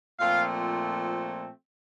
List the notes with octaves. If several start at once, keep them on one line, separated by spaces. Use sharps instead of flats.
A#2 F3 A3 C4 F4 F5